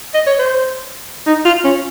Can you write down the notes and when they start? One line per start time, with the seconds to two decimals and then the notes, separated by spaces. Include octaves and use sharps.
0.14 D#5
0.27 C#5
0.39 C5
1.27 D#4
1.46 F4
1.64 C#4